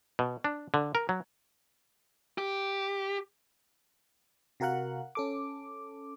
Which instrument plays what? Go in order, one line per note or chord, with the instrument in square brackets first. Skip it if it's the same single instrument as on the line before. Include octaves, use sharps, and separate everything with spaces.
[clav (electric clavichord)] B2
D4
D3
A#4
F#3
[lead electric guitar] G4
[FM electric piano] C3 F#4 A#4 F5 F#5 F#6
C#4 A4 D6